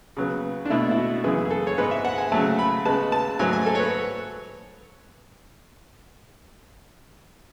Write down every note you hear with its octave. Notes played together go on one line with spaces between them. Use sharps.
C#3 F#3 B3
D4
B2 A3 E4
E4
F#4
F#2 C#3 E3 B3 G#4
G#4
A4
C#5
G#2 G#3 B3 B4
E5
F#5
G#5
C#3 F#3 A3 A5
B5
C#3 G#3 B3 A5
A5
G#2 F#3 A3 G#5
G#5
A4
C#5
B4